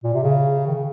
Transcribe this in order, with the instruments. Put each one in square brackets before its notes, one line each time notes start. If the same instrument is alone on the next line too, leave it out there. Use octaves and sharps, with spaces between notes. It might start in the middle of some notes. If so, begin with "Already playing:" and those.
[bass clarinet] A#2
C3
C#3
D#3
C#3